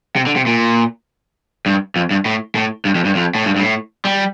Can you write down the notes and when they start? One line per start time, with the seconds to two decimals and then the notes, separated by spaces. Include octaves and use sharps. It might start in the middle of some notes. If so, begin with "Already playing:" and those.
0.16 C3
0.26 D3
0.36 C3
0.46 A#2
1.66 G2
1.96 F2
2.11 G2
2.25 A2
2.55 A2
2.85 G2
2.95 F2
3.05 G2
3.15 F2
3.35 A2
3.45 G2
3.56 G2
3.60 A2
4.05 G3